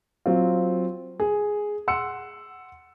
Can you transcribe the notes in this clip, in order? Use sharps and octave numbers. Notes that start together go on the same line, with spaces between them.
F#3 C4 F4
G#4
F#5 C6 E6 C#7